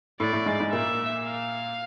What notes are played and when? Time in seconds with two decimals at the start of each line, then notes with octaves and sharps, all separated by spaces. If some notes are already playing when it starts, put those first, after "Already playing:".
0.20 A2 A3 D5
0.33 A2 A3
0.46 G#2 G#3
0.60 G#2 G#3
0.73 A#2 A#3 E5
1.26 F5